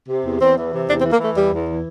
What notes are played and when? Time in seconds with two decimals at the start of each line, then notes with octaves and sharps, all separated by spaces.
0.09 C3
0.25 E2
0.41 E2 C4
0.57 E3
0.72 C3
0.88 E2 D4
1.00 C4
1.04 E3
1.12 A#3
1.19 E3 A3
1.36 E2 G3
1.52 E2
1.67 E3